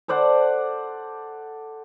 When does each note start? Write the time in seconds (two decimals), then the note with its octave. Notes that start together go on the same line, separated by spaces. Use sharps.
0.08 A4 C5 D5 F#5